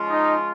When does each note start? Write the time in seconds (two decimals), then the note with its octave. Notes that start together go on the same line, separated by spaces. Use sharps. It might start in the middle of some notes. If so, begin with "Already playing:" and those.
Already playing: F3 G#3 C#4 F4
0.09 D#4